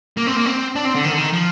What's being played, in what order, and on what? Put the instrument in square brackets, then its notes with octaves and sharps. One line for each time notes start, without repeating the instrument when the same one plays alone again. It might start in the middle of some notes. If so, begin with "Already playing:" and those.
[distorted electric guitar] A#3
C4
A#3
C4
D4
C4
D3
D#3
D3
D#3
F3